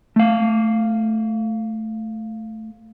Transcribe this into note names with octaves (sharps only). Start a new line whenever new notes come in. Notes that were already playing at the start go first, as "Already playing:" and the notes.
A3 F5